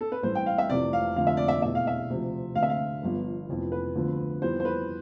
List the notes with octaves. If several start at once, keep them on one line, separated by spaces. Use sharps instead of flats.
A4
B4
A1 G2 E3 A3 C5
G5
F5
E5
F1 F2 C3 E3 A3 D5
F5
F2 D3 A3 F5
E5
D5
E5
E2 B2 A3 E5
F5
E5
D2 C3 F3
D2 D3 A3 F5
E5
F5
G1 G2 F3 B3
F1 F2 E3 B3
B4
D2 D3 F3 B3
F2 E3 G3 B3 C5
C5
B4